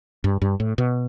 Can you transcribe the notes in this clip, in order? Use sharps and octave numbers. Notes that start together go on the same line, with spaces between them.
G2
G2
A2
B2